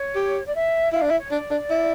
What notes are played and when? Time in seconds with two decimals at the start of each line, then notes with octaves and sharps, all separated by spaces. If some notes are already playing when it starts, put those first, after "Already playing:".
Already playing: C#5
0.15 G4
0.45 D5
0.54 E5
0.93 E4 F5
1.02 D4
1.06 E4 E5
1.19 C#5
1.31 D4 D5
1.51 D4
1.70 E4